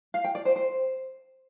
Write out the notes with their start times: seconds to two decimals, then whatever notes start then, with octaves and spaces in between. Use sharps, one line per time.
0.14 F5
0.24 G5
0.35 D5
0.45 C5
0.56 C5